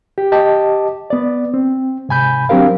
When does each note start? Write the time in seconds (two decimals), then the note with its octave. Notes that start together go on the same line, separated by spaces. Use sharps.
0.18 G4
0.32 G4 D#5 A5
1.10 B3 D5
1.54 C4
2.09 G#2 C3 G#5 B5 G6
2.49 F#3 C4 D4 G4 A#4 F5